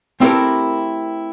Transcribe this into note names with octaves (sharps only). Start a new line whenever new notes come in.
A3 C4 E4 G4 A4 A#4